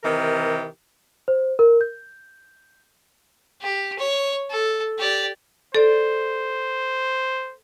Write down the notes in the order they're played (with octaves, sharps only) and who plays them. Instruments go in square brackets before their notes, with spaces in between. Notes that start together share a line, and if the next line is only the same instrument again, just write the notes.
[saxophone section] C3 D#3 E3 G4 A#4
[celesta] C5
A#4
G6
[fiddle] G4
C#5
A4
G4 D5
[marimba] A4 D5 [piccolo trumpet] C5